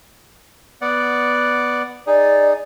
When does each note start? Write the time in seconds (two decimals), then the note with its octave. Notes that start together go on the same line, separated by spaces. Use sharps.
0.81 B3 D5 F#5
2.07 D#4 G#4 D5